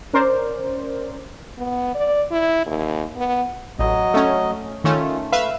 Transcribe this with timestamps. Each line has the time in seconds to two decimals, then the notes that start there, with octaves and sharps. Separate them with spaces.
0.13 C#4 A#4 C5 D5
1.58 B3
1.95 D5
2.31 E4
2.66 D#2
3.16 B3
3.79 A1 F#3 D#5
4.14 A3 C#4
4.84 D#3 A3 C#4 F4
5.32 A3 B4 E5 F5